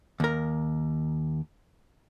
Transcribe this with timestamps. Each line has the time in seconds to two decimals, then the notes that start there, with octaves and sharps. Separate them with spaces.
0.20 D#2 A#4